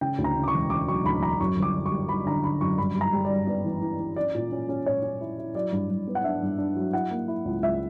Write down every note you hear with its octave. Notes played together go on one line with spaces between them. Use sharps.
C#3 G5
D2
A#5
C#3
D6
C#6
E1
C#3 D6
F#3 C#6
D2 B5
E1 A#5
F#2 C#6
G1
D6
G1
C#6
G3
G1 B5
D3 A#5
D3 B5
F#2 C#6
G2 B5
G3
A#5
G3
G2 D5
B3 D5
E3
E3
E3
C#4 D5
A#2
C#4
C#4
A#2 C#5
C#4
E4
E4
F#3 D5
G2
G2
B3
F#5
D4 E5
G2
D4
F#3
E4 F#5
A#3
E4
C#2
C#2 E5